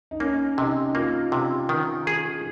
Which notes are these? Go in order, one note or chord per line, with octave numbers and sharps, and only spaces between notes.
D#4
A#3 C#4
C3 D#4
A#3 F4
C3
D#3
G#4